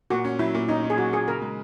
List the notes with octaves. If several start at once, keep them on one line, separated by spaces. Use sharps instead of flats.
A#2 F#4
C#4
F#3 E4
A#2
C#4 D#4
C#4
G#4
F#3 F#4
A#2 G#4
C#3 A#4
G#3